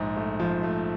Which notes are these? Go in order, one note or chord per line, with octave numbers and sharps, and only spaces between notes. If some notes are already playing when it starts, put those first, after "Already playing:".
Already playing: A#1 G#2
A3
F3
A3